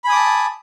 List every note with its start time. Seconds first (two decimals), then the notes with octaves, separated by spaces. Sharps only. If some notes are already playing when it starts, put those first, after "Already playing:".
0.04 B5
0.07 G#5
0.10 D#6
0.12 D6
0.15 A5